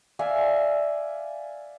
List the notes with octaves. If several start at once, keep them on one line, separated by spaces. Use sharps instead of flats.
D5 E5 F5 G#5